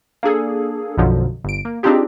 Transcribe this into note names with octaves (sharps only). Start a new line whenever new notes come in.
A#3 D4 G#4 A4
B1 F#2 B2 D3 F3 F#3
G1 D7
A#3
C4 D4 D#4 F4 G4 G#4